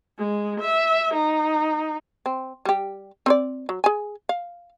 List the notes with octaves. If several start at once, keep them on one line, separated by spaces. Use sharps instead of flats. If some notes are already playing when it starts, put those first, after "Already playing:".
G#3
E5
D#4
C4
G3 G4
C4 C5 D5
F#3
G#4 G#5
F5